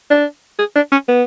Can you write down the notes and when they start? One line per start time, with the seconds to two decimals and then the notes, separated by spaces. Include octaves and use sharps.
0.10 D4
0.59 G#4
0.75 D4
0.92 C#4
1.08 B3